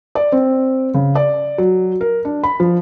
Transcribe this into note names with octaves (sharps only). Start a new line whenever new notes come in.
D5
C4
C#3
D5
F#3
A#4
D4
B5
F3